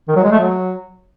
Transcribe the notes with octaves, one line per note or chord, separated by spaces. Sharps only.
D#3
F#3
G#3
A3
F#3